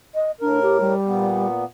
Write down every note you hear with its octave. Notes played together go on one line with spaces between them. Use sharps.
D#5
A2 D4 A#4
G4
G3
A#2 B3